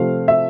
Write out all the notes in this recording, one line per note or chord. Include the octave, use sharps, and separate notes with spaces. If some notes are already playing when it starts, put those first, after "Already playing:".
Already playing: C3 F3 A3 C4 F5
E5